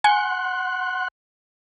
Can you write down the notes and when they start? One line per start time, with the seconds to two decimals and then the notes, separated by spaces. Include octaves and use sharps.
0.04 F#5 G#5 C6 F#6